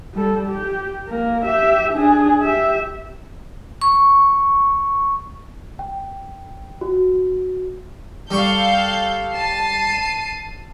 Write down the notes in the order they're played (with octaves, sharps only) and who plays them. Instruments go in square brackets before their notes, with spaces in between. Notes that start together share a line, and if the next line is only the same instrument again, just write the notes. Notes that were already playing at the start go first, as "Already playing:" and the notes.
[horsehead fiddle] G3 A4
G4
A#3 A#4
G4 E5
D4 G#4
G4 E5
[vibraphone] C#6
[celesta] G5
F#4
[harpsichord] G3 C#6 [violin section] A4 F5 [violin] G6
[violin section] A5 [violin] C7 D#7